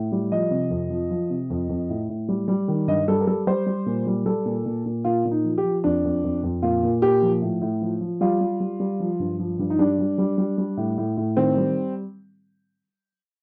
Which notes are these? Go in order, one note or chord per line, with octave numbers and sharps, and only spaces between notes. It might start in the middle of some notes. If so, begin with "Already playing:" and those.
Already playing: A2
G3
F3 D#5
C3
F2
F3
F3
C3
F2
F2
A2
A2
G3
G3
D#3
G2 D#5
G3 A4
A#4
G3 A4
G3 C5
G3
A#2
G3
G3 A4
A#2
A#2
A#2
A#2 F4
A#2
D#4
F3
G4
F3
F2 D4
F2
F2
F2
A#2 F4
A#2
A#2 G4
F3
A2
A2
F3
F3
G3 F4
G3
G3
G3
F3
G2
F3
G2
D#4
G3 D4
G3
G3
G3
G3
A2
A2
A2
D#3 C4
G3